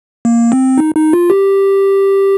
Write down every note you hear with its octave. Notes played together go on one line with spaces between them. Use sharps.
A#3
C4
D#4
D#4
F4
G4